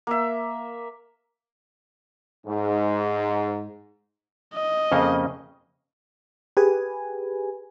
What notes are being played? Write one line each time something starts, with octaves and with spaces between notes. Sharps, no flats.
A#3 E5
G#2
D#5
F2 C#3 A#3
G4 G#4 B4 G#5